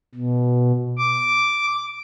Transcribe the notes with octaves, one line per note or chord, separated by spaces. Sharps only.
B2
D6